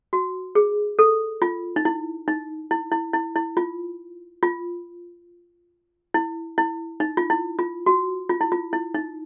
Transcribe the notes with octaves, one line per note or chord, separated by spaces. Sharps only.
F#4
G#4
A4
F4
D#4
E4
D#4
E4
E4
E4
E4
F4
F4
E4
E4
D#4
F4
E4
F4
F#4
F4
E4
F4
E4
D#4